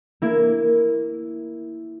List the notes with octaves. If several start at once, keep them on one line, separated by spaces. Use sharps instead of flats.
A#3 E4